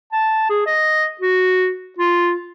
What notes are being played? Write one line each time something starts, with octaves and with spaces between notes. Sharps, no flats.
A5
G#4
D#5
F#4
F4